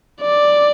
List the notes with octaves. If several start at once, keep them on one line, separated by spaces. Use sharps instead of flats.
D5